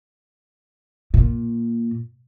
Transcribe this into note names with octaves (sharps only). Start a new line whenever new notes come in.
A#2